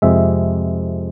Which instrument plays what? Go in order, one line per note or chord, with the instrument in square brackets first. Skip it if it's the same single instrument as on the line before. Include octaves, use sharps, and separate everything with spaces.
[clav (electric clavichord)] F2 C3 G#3 E5